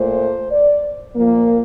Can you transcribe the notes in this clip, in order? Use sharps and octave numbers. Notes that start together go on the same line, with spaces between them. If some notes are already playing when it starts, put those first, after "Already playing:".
Already playing: A#2 A3 C5
D5
A#2 F3 A#3